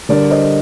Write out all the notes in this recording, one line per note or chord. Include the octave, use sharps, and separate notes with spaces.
D3 G3 D4 A#4 D5
C5 D#5